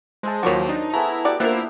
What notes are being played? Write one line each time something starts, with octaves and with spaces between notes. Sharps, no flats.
G#3 C5 E5 A5
D#2 F3 F#3 F#4 A#4 C#5 D6
D4 D#4
A3 B3 E4 G#4 A#5
F#4 G4 D5
A#3 B3 D4 E4 F4 A#4 C5